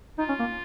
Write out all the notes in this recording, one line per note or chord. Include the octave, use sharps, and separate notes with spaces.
D#4 F4
C#4
A#3